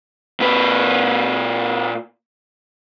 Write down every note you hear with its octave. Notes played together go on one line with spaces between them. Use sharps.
A#2 B4